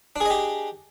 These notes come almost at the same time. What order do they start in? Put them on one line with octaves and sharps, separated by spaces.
D4 G#4 D#5 G4